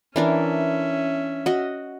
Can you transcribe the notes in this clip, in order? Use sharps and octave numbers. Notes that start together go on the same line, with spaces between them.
E3 C#4 D4 A#4 E5
F#4 D#5